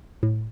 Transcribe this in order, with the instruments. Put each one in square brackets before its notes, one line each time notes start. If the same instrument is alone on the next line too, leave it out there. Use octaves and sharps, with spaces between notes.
[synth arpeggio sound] A2